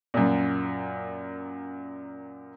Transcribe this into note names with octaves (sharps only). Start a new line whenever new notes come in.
F#2 A#2